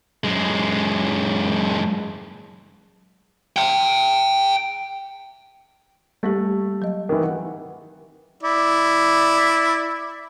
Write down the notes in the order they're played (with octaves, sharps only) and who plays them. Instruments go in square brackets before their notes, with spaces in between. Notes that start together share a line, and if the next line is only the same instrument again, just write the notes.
[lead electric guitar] F#2 G#3
E5 G5
[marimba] G3 A#3 G4 [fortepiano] A3
[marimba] F#3 D#5
[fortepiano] D#3 E3
F#5
[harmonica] E4 D5